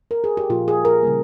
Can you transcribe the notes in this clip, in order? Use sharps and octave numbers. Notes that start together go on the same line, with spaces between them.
A#4
G#4
G4
A#2 F3 A#3 F4
G#4
A#4
C#3 G3 A#3